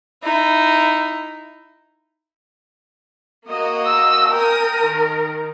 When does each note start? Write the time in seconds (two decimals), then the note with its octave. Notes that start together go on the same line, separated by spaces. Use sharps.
0.23 D#4 E4
3.48 A#3 F#4 D#5
3.87 E6
4.30 A#4 G5 G#5 D#6
4.83 D#3